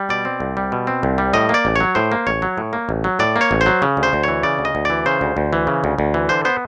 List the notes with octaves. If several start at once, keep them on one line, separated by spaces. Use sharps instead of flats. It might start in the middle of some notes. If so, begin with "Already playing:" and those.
Already playing: G3
B2 D5
C4
C2
G3
B2
C4
C2
G3
A2 D#5
A#3 D5
A1
F#3 C#5
A2 C5
A#3
A1 C#5
F#3
A2
A#3
A1
F#3
A2 D5
A#3
C#5
A1
C5
F#3
C#3
D2
C5
D2
E3 C#5
C#3 D5
D2
D#5
D2
E3 D5
C#3 C5
D2
D2
E3
C#3
D2
D2
E3
D3 C5
B3 C5